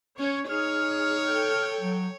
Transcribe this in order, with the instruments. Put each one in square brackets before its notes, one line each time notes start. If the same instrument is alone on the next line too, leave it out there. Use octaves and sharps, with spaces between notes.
[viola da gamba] C#4 [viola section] C#5
[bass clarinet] D#4 [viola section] G#4 [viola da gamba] C#5 [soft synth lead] F6
[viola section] A4 G5
[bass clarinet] F#3